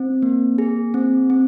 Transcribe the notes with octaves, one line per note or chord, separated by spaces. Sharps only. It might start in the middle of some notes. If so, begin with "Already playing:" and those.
Already playing: C4
A#3
G#4
C4
C4